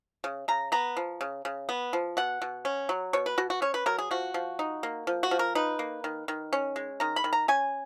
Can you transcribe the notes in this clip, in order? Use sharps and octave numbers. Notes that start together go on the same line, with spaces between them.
C#3
C#3 A#5
B3 A#5
F3
C#3
C#3
B3
F3
B2 F#5
B2
C#4
F#3
B2 C#5
B4
B2 F#4
F#4
C#4 C#5
B4
F#3 A#4
G#4
F3 F#4
F3
D#4
A#3
F3
F#4
F3
A#4
D#4 B4
A#3
D#3
D#3
C#4
G#3
D#3 A#5
B5
D#3
A#5
C#4 G#5